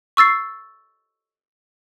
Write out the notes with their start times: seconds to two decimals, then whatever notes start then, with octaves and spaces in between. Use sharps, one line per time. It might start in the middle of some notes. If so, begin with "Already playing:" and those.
0.17 C#6 E6 A6 C7